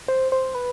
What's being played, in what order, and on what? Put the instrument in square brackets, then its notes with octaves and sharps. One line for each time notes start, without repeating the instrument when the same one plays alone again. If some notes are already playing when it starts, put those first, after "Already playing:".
[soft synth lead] C5
C5
B4